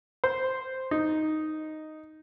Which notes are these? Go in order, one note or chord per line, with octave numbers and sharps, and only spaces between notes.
C5
D#4